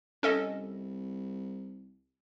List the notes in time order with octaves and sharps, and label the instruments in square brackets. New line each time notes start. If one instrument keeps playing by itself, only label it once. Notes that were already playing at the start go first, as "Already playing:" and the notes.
[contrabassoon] C2 [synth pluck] C#4 A4 D#5